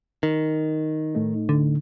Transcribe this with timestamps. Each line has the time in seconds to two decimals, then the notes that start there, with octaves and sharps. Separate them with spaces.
0.23 D#3
1.15 A2 A3 D#4
1.49 D3